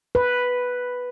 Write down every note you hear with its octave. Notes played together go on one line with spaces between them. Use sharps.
B4